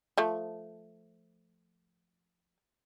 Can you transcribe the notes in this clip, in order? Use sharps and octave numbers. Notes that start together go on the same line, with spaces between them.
F3 A3